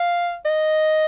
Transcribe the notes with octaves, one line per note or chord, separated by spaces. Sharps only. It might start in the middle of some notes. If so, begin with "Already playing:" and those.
Already playing: F5
D#5